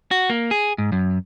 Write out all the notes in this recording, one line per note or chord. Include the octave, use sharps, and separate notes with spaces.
F#4
A#3
G#4
G#2
F#2